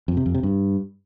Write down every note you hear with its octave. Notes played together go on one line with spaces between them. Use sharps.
F2
C3
F2
C3
G2